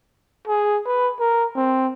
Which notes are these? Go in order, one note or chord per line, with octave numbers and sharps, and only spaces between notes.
G#4
B4
A#4
C4